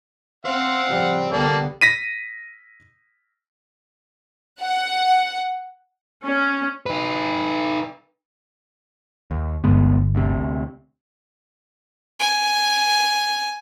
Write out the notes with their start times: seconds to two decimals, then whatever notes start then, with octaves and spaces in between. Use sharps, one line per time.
0.45 C4 C5 F5 F#5
0.88 A2 C#3 F3 G3
1.32 C2 D3 A#3 B3 A4 D5
1.81 A#6 B6 D#7
4.62 F#5
6.24 C#4
6.86 D#4 B4
9.31 D#2
9.64 G1 C2 G#3 B3
10.15 D2 C3
12.20 G#5